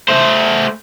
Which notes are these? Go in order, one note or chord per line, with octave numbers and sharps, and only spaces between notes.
A3 C5